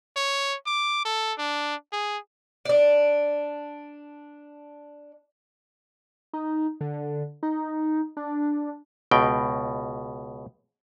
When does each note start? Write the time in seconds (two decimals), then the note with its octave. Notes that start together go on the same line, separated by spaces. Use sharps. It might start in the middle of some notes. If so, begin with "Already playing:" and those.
0.16 C#5
0.67 D6
1.05 A4
1.38 D4
1.93 G#4
2.65 D4 D5
6.33 D#4
6.81 D3
7.43 D#4
8.17 D4
9.11 C#2 B2 G5